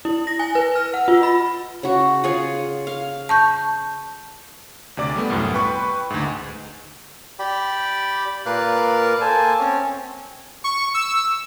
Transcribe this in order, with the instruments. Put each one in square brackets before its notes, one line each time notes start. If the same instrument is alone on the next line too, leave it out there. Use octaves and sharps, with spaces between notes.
[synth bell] E4
A#6
G#5
B4
F6
F#5
F4
B5
[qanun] C#3 F#4
F4 G#4 C#5
F5
[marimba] A5 C#6 G6
[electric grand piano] D2 C3 D5 D6
G3 A3 B3
C2 F#2 A2
B4 G5 B5 C#6
D2 G#2
[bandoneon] G4 D5 G5 B5
A#2 A#4 B4 D5 F5 F#6
A#3 A4 C5 G#5 A5
C4 C#4 C#5
[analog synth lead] C#6
E6